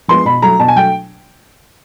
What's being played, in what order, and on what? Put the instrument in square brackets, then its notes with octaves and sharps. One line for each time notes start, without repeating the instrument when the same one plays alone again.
[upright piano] F3 G#3 B3 C6
B2 B5
F#3 A3 A#5
B2 A5
G#5
F#3 A3 G5